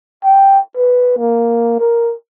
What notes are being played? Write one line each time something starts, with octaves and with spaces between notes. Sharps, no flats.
G5
B4
A#3
A#4